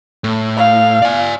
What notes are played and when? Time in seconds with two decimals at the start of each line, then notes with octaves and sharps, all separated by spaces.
0.24 A2
0.57 F5
1.02 D5 G#5